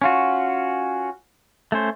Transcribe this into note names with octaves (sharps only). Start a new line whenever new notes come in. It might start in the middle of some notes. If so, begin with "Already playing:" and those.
C#4 F4 F#4
A3 C#4 C5